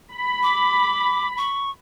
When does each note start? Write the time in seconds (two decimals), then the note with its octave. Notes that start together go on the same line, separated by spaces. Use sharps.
0.13 B5
0.43 D6
1.37 C#6